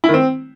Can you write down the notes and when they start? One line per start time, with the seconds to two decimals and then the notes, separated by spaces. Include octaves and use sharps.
0.04 E4
0.09 D#3
0.14 C4